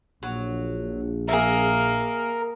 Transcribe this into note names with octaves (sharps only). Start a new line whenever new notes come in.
A#1 F#3
A#3 G#4 A#4 E5